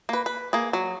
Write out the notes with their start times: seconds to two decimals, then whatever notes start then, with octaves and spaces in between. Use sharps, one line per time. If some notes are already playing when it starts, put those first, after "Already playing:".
0.09 A#3 B4
0.26 B4
0.53 A#3 G#4
0.73 F#3